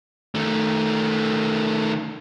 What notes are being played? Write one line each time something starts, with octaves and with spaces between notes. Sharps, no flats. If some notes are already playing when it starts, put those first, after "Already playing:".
D#3 A3